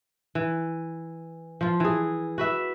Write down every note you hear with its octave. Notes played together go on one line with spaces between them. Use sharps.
E3
F3 F4
E3 G#4
F#4 B4 E5